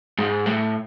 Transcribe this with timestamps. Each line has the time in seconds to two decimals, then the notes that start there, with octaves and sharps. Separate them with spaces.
0.18 G#2
0.46 A2